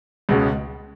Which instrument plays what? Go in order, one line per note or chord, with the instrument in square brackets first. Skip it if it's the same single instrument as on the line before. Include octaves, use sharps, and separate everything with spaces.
[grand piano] C#2 B2 G#3 C#4